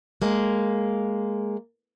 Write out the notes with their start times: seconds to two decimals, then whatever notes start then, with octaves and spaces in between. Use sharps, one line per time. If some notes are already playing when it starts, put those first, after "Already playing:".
0.22 G#3 A#3